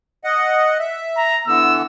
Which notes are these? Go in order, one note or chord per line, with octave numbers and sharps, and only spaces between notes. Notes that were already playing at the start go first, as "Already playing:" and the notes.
D#5 F#5
E5
A#5
D3 E3 B3 E6